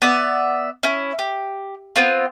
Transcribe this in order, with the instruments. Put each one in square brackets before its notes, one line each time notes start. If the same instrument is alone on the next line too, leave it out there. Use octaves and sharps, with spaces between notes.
[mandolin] B3 D5 E5
C#4 E4
G4
B3 C4 F4